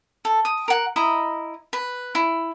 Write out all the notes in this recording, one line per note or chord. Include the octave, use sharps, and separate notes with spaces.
A4
D#6
A#4 F#5
E4 D#5 A#5
B4
E4